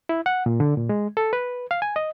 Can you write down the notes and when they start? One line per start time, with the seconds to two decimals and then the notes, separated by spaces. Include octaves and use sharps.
0.09 E4
0.26 F#5
0.46 A#2
0.60 D3
0.77 A#2
0.89 G#3
1.17 A4
1.33 B4
1.71 F5
1.82 G#5
1.96 D#5